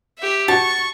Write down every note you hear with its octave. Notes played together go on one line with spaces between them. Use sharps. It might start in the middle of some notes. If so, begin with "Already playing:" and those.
G4 E5
F#4 A5 C#6